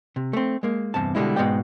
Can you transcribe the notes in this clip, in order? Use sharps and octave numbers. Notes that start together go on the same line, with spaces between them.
C3
A3 C4
G#3 A#3
E2 G2 C3 A5
B2 D3 G3 G#3 E4
G#2 B2 G#3 D5 G5